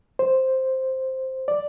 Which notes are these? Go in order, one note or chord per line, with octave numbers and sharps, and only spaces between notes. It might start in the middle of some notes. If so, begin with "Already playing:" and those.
C5
D5